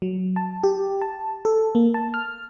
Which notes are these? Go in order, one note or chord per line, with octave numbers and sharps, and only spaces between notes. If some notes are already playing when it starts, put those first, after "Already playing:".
F#3
A5
G4
A5
A4
A#3
A5
F6